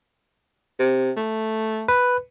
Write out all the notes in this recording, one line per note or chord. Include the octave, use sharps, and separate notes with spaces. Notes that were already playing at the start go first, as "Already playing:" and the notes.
C3
A3
B4